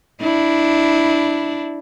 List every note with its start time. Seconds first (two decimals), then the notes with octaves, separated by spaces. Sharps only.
0.21 D4 E4